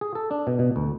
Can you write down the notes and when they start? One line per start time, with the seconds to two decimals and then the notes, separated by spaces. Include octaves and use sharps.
0.01 G#4
0.15 A4
0.31 D4
0.47 B2
0.59 B2
0.76 D2